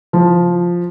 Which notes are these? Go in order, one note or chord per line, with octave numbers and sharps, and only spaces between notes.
F3